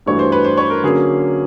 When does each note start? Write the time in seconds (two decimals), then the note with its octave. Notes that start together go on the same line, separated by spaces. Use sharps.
0.06 G2 E3 A3 D4 F#4 C#5
0.19 C5
0.32 B4
0.45 C5
0.57 C#5
0.70 A#4
0.83 D3 F#3 A#3 C#4 G#4